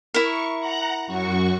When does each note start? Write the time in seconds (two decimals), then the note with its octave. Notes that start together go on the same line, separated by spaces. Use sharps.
0.14 E4 A#4 C#6
0.60 F#5 A#5 F#6
1.07 F#2 F#4 C#6